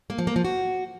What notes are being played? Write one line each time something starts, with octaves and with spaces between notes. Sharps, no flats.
A#3
F3
A#3
F3
F#4